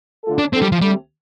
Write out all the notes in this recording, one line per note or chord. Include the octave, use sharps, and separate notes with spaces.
D3 A3 F4 A4
D4
F3 C4 D4 A4
G3
F3
D3 G3 A3 C4